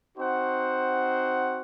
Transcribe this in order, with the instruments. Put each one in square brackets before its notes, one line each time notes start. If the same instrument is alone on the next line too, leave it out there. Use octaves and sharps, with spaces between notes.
[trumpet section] C4 D#4 F#4 C5 F#5